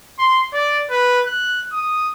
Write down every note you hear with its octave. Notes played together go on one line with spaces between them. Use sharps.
C6
D5
B4
F#6
D#6